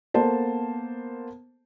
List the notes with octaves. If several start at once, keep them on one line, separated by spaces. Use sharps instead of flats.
A#3 B3 A4 C5 A5